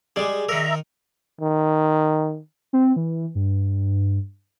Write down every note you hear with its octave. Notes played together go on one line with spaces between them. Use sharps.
G3 G#3 G#4 D5
D#3 A#4 E5 A#5
D#3
C4
E3
G2